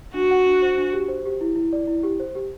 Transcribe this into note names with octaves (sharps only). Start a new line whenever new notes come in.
D4 F#4
F#5
D4
C5
D4
G4
C5
G4
E4
E4
D5
E4
G4
C5
G4